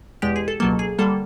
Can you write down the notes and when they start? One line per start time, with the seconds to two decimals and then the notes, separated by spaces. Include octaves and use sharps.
0.22 E2 B2 G#3 G4
0.36 G#4
0.48 A4
0.60 C#2 B2 F#3 A#3 A4
0.79 G#4
0.99 D3 G3 A#3 A4